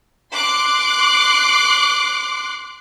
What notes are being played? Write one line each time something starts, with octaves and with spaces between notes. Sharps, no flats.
C6 D6 F#6 C7